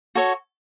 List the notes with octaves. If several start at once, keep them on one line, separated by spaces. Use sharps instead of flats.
F#4 A4 C#5